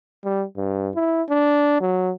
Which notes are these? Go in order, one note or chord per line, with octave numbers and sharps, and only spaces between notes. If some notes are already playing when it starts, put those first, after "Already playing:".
G3
G2
E4
D4
F#3